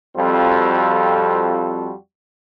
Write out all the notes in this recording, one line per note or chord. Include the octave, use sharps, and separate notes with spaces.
F2 G3 C4 F4 F#4 A4